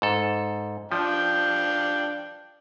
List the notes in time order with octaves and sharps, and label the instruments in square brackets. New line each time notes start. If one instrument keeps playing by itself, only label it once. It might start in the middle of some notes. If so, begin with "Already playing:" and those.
[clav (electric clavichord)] G#2 A4
[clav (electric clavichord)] F3 [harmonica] D4 F5 G5